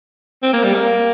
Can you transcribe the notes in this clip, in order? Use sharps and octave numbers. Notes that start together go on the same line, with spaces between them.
C4
A#3
G3
A#3